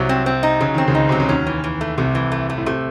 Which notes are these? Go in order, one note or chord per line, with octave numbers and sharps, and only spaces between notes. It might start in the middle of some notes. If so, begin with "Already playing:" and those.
Already playing: C2 C3 F#3
C4
C4
D#4
C#3 F#3
D#3 C4
C#2 C#3
D#4
C3 F#3
C#3
D#2 D#3 C#4
E3
E3
A3
C2 C3 A3
E3
A3
A3
A2
C3 A3